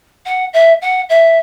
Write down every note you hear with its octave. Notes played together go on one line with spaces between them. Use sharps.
F#5
E5
F#5
E5